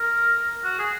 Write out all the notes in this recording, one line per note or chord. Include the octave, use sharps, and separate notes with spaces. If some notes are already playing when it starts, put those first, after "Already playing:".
Already playing: A#4
F#4
G#4